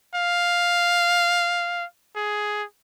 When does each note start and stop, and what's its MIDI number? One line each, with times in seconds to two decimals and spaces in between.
0.15 1.85 77
2.16 2.64 68